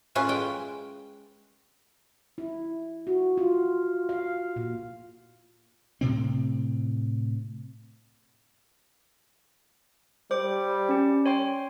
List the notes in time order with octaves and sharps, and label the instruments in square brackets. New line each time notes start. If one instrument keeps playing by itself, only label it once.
[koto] A2 C#4 F4 B4
G#3 G5
[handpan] E4
F#4
F4
F5
A#2
[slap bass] A2 C3 C4
[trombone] G3 [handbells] C5 D6
[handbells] C#4 G4
C#5 G5 C6